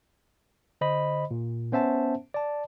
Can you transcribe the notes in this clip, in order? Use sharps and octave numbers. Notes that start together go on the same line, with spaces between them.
D3 C5 D#5 B5
A#2
B3 C#4 C5 E5 F#5 A5
D5 A5